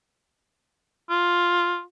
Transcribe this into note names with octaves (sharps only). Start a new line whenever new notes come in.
F4